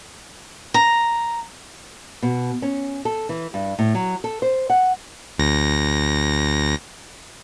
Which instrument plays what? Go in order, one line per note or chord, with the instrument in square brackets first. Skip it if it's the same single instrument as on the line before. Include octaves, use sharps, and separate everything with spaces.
[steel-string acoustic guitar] A#5
[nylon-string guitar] B2
C#4
A4
E3
G2
A2
F#3
A4
C5
F#5
[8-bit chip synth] D2 A#6